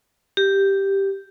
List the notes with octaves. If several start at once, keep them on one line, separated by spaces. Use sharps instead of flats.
G4